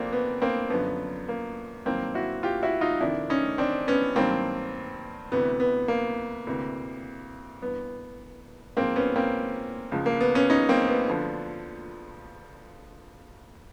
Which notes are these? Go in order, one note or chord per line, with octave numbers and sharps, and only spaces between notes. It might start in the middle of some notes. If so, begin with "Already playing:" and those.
Already playing: F2 C3 A#3 C4 D4
B3
A#3 C4
F#2 D3 F3 B3
A#3
G2 D#3 F#3 A#3 C4
E4 F#4
F4 G4
E4 F#4
D#4 F4
F2 C3 D#3 D4 E4
C#4 D#4
C4 D4
B3 C#4
G2 D#3 F#3 A#3 C4
D2 C3 E3 B3
B3
A#3
D2 C3 E3
G2 E3 B3
G#2 F3 A#3 C4
B3 C#4
A#3 C4
C#2 C#3 F3
A#3
B3
B3 C#4
C#4 D#4
A#3 C4
B3
D2 D3 F3